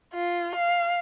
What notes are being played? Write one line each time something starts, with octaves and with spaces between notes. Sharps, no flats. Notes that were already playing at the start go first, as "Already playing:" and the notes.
F4
F5